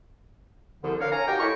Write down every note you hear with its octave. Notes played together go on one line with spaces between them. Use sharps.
C2 D3 F3
B3 D4 A#4 C#5 F5
C#5 F5 G#5 A#5
D#4 F#4 G4 A#4 C#5 G5
A3 E4 C#6